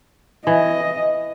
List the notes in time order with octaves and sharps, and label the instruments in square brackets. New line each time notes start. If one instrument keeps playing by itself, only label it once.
[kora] E3 [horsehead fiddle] D#5